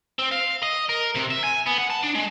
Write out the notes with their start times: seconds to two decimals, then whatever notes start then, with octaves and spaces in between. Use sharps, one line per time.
0.19 C4
0.32 F5
0.63 D#5
0.89 A#4
1.15 C3
1.30 E5
1.44 G#5
1.66 B3
1.78 F#5
1.90 A5
2.03 D4
2.15 G#3